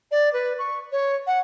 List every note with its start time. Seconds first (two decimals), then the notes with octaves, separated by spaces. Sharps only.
0.11 D5
0.33 B4
0.59 C#6
0.92 C#5
1.27 F#5